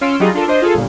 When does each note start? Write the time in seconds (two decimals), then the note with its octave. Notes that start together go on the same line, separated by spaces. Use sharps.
0.01 C#4 F4 C6 E6 D7
0.20 F#3 G3 D#4 F4 G#4
0.34 D4 F4 A4 A#4
0.48 D4 C5 D#5
0.62 F4 G#4 A4
0.74 G1 G2 A#2